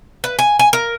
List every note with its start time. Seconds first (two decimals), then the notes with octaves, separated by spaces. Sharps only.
0.24 B4
0.39 G#5
0.59 G#5
0.73 A#4